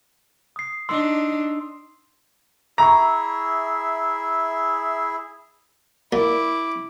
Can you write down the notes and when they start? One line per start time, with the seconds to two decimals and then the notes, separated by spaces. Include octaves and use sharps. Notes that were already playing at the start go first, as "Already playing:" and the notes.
0.56 D#6 C7
0.89 D4 D#4 C6 E6 C7
2.78 E4 G#4 E5 A#5 C#6
6.13 A#2 E4 D6